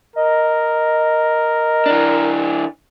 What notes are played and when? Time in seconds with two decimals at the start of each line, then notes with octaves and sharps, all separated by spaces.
0.16 A#4 D#5
1.86 E3 D4